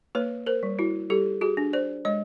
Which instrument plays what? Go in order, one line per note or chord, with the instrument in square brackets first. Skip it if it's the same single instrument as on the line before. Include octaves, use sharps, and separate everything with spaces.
[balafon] A#3 B4 C#5
A#4 C5
G3
E4 F#4
G3 G4 A4
F#4 G#4
D4
C5 D5
G#3 C#5 D#5